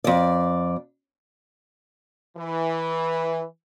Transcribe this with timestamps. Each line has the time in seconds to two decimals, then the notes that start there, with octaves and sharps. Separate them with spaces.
0.04 F2 D5
2.36 E3